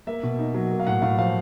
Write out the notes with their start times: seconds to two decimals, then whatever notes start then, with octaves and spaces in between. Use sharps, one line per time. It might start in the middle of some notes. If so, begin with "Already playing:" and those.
0.07 A#3 E5
0.23 B2
0.39 D#4
0.54 F#3
0.71 A#3
0.80 F5
0.87 A2 F#5
1.02 A2 F5
1.18 F3 F5